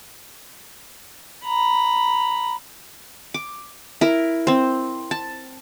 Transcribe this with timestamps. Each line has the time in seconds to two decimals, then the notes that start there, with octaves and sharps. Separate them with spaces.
1.45 A#5 B5
3.34 D6
4.01 E4 A#4
4.47 C4 C5
5.11 A5